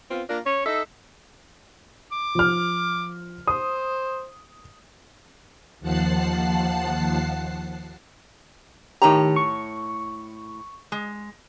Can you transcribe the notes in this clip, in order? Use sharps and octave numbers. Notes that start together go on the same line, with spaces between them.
B3 C4 F4
A#3 D4 F4 A#4
C#4 C#5
D#4 A4 D#5 E5
D6
F3 F6
C5 D#6
D#2 F3 F#5 A5 F#6 C7
A2 D#3 G4 C#5 A#5
C#6
G#3